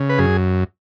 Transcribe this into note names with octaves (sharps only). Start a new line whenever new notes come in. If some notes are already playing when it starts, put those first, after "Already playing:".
Already playing: C#3
B4
F#2 G#4